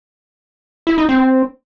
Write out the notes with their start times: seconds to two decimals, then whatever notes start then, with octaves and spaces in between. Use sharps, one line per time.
0.87 E4
0.98 D#4
1.09 C4